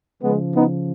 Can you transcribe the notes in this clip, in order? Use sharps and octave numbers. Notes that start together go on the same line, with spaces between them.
C#3 F3 G#3 B3
B3 D#4